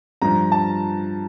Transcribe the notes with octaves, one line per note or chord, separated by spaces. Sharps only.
G2 F3 A#5
A5